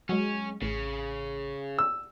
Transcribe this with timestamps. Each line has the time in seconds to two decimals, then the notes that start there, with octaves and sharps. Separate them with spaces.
0.09 F#3 G#3 C#4
0.62 A1 C#3
1.79 E6